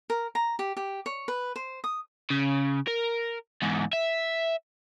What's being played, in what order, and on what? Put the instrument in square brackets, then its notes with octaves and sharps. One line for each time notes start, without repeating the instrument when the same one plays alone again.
[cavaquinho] A#4
A#5
G4
G4
C#5
B4
C5
D#6
[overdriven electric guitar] C#3
A#4
E2 G#2
E5